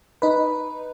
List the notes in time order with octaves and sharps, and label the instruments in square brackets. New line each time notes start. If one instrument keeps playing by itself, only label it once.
[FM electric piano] D#4 B4